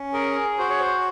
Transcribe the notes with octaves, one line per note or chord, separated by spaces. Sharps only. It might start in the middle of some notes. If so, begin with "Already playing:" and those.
Already playing: C#4
G#4 A#4
F#4 C5
C#5
C5